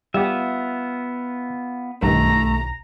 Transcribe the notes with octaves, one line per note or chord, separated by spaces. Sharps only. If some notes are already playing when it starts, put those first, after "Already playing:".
G3 B3 F4 G4 E5
B1 G2 D#3 A3 A#5